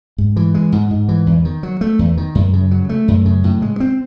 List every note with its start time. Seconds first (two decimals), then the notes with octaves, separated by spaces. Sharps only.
0.18 G#2
0.36 E3
0.55 G#3
0.72 G#2
0.91 G#2
1.08 E3
1.26 E2
1.45 D#3
1.63 F#3
1.81 A3
1.99 E2
2.17 D#3
2.35 F#2
2.53 C#3
2.71 F#3
2.89 A3
3.08 F#2
3.25 C#3
3.44 A2
3.62 G#3
3.80 C4